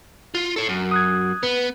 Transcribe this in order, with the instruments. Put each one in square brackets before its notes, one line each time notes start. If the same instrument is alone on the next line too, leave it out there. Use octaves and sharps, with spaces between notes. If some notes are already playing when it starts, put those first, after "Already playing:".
[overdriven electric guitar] F4
A4 C#5
F#2
[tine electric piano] D#6 F#6 G#6
[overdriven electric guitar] B3 [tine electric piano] B4